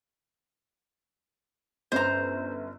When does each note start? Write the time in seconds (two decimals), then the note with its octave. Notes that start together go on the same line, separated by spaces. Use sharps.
1.92 G1 C#4 C5 A#5